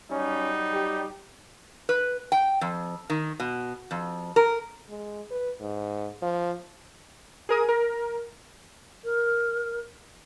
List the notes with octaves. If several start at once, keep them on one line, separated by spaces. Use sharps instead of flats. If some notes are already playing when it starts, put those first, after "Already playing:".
F#3 G3 C#4 D#4
G4
B4
G5
F2
D#3
B2
F2
A#4
G#3
B4
G#2
F3
G#4 A#4 D#6
A#4
A#4